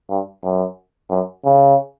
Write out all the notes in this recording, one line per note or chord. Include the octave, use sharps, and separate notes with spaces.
G2
F#2
F#2
C#3